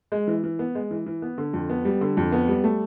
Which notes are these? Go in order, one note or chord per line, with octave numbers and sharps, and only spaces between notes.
G#3
E3
E3
B3
G#3
E3
E3
B3
D3
F2
B3
G3
D3
F2
B3
G3
A3